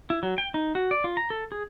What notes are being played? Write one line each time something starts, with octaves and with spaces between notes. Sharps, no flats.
E4
F#3
G5
D#4
F#4
D5
F4
A#5
A4
G#4